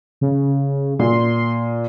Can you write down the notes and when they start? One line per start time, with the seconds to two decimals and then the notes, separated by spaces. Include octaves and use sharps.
0.21 C#3
0.99 A#2 C6